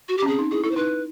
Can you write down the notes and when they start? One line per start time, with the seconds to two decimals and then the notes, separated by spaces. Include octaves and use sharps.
0.09 F#4
0.18 G4
0.22 C#4
0.26 C4 G#4
0.39 D#4
0.51 E4 G#4
0.63 E4 A4
0.71 C5
0.76 D#4 B4